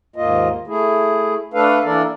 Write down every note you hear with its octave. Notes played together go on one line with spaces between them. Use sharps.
D#2 G#2 A#3 F4 D#5
A3 E4 G#4
A3 D4 A4 B4 F5
E3 A#3 D4 A4 A#4 D5